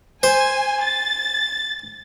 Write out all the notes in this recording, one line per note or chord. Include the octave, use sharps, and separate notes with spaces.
C5 G#5
A6